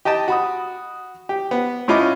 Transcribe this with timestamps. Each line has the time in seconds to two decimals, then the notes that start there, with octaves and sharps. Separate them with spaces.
0.05 G4 D#5 G5 A5
0.28 F#4 B5 D#6
1.29 G4
1.51 B3
1.88 A2 C#4 F4 D#5 B5 D6